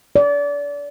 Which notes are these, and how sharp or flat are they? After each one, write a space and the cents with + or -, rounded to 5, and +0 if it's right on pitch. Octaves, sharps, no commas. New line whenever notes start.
D5 -30